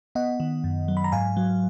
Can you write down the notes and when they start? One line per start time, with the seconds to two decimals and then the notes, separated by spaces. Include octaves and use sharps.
0.15 B3 D#5 F#5
0.40 D#3
0.64 F#2
0.88 F#3
0.97 B5
1.04 A#5
1.12 G#2 F5 G#5
1.37 F#3